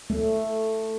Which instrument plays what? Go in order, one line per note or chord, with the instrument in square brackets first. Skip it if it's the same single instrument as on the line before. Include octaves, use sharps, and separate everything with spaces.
[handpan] A3